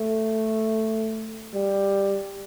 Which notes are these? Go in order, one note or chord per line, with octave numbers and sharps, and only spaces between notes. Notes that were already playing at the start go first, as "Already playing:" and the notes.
Already playing: A3
G3